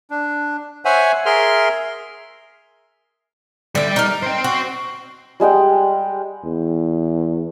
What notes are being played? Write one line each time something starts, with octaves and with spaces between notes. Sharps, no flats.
D4
C5 C#5 E5 F#5 G#5
G#4 A#4 E5 C6 F6
D3 G3 D5 E5
D#4 A#4
C5 G5
F#4
G3 G#3 F#5 G5
E2